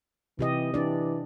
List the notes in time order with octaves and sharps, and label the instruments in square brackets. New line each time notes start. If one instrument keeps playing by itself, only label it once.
[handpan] C3 G4 D#5 [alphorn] E3
[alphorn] E3 [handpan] D4 D5